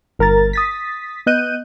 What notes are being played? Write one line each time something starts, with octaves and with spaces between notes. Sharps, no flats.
G1 A#4 A#5 A6
D#6 A6 B6
B3 D#5 F#6 G6 D#7